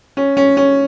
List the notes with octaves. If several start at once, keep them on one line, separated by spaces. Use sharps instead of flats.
C#4
C#4
C#4